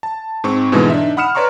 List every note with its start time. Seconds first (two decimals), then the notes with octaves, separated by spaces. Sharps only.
0.03 A5
0.44 G#2 C4 C#6
0.72 G#2 B2 D3 E3 G#3
0.90 D4 D#4 E5
1.17 F#5 B5 D#6 F6 C#7 E7
1.35 B4 C#5 D5 A#5 C6 C#6